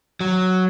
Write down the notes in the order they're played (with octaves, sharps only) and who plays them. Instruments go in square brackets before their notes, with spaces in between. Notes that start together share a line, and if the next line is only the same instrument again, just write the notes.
[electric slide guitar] F#3